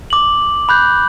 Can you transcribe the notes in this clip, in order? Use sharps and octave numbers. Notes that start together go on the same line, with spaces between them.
D6 F#7
B5 F#6 G6